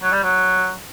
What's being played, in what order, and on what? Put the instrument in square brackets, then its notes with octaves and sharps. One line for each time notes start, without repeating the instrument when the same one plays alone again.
[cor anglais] F#3
G3
F#3